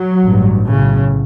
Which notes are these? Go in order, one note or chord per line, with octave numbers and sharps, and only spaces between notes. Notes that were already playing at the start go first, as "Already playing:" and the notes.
Already playing: F#3
A1 G2
B1 A2 C#3